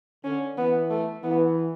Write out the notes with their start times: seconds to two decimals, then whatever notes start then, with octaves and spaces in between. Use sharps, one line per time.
0.24 D3 C#4
0.57 E3 B3
0.90 A3
1.23 E3 B3